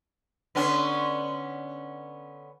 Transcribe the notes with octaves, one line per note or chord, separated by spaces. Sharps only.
D3 B3 C#4